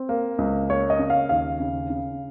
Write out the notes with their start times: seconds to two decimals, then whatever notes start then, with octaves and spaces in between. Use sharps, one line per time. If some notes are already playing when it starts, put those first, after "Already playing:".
Already playing: C4
0.09 A#3
0.38 C#2
0.70 A#3 C#5
0.90 D#5
0.99 C#3
1.10 F5
1.29 D#2 F5
1.60 C#3
1.90 C#3